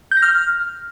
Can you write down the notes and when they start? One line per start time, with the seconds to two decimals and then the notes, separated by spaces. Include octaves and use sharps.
0.11 G6
0.17 A#6
0.22 F6